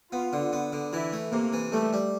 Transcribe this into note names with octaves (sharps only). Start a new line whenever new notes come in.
B3 F4
D3
B3
D3
E3 E4
A3
C3 A#3
E3
G3 A3
G3